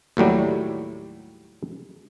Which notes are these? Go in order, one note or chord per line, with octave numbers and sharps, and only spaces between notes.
D#2 A2 F#3 G3